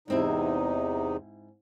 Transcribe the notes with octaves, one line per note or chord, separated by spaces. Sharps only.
E2 G#2 C3 C4 D#4 E4